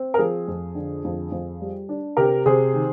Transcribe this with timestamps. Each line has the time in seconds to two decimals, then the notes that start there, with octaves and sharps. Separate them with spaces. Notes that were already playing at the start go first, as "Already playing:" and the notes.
Already playing: C4
0.14 A#4
0.18 F3 G#4
0.48 F2
0.75 D3
1.04 F2
1.32 F2
1.61 G3
1.89 D4
2.17 C3 G4 A#4
2.46 C3 G#4 C5
2.74 D#3